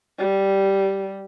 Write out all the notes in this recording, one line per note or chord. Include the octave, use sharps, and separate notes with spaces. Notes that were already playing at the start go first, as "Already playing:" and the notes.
G3